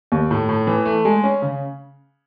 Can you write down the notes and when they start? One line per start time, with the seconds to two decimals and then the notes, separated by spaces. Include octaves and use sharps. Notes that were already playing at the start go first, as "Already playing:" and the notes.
0.12 D#2
0.31 A2
0.49 A2
0.67 E3
0.85 A3
1.05 G#3
1.24 C#4
1.42 C#3